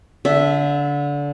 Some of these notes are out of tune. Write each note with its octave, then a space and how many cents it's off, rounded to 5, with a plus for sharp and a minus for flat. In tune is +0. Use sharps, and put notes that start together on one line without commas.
D3 -25 E5 +0